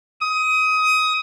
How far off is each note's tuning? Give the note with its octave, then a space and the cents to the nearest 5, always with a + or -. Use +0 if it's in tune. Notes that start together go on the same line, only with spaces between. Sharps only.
D#6 +20